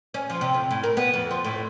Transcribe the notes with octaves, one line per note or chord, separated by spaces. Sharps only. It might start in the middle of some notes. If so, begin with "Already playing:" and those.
C#4
F3
C3
F2
A2
A#4
B3
F2
F3
A2